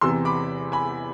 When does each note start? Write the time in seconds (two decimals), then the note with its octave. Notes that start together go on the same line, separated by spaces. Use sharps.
0.01 E2 C3 E3 C6 E6
0.25 B5 D6
0.72 G#5 B5